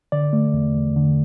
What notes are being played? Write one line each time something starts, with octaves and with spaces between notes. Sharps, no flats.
D3 D5
A3
E2
E2
D3